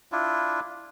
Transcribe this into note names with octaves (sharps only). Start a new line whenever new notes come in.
D4 E4 F4